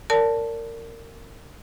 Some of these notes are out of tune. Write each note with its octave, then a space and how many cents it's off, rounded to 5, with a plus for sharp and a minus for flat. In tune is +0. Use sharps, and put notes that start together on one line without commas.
A#4 -25 D5 -30 A5 +0